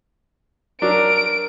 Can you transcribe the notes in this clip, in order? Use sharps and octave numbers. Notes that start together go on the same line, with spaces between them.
F#3 D4 A#4 D7